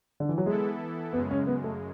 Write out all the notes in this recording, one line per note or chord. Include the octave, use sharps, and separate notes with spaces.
D3
E3
F#3
E3 G#3 B3 E4 A4
F#2 C#3 G#3 B3
C#4
B3
A3